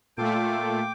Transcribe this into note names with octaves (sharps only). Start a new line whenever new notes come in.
A#2 A3 F4 A4 G5 D6